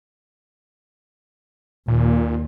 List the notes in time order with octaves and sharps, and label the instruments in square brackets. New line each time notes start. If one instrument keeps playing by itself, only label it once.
[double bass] D#2 [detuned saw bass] A#2